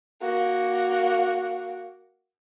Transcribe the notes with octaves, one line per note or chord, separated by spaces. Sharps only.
A#3 F#4